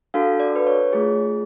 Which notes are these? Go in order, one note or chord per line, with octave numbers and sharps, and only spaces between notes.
D4 F#4 A4 F5
D5
B4
C#5
A3 F4 G#4